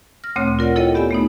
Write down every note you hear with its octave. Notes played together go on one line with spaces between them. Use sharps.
F6 A#6
D2 A#2 A3 C4 C#5
F4 A#4 D5 F#5
E4 A4 C#5 D#5 G5
B3 G4 D5 E5 G#5
A3 B3 D#4